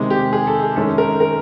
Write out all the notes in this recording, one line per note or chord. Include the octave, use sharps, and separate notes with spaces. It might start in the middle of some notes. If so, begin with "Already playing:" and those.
Already playing: C3 D#3 G#3
G4
G#4
A4
G#4
F#2 D#3 G#3 C#4 A4
A#4
A#4